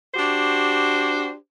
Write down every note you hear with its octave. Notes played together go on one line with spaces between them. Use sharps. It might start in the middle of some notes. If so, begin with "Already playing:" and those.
D4 F#4 G4 C5